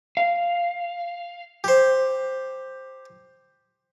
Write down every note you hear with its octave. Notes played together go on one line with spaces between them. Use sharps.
F5
G4 C5